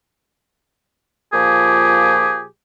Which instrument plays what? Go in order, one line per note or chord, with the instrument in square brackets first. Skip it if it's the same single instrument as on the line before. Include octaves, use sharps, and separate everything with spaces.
[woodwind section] A#2 F3 G4 G#4